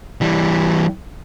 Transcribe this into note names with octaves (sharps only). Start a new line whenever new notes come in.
E3 G3